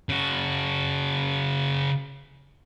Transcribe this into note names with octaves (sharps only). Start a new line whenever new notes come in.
C#3 F#4